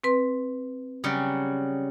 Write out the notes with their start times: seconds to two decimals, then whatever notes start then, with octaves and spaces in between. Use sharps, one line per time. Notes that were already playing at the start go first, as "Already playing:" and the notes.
0.04 C4 B4 C6
1.04 C#3 F#3 G3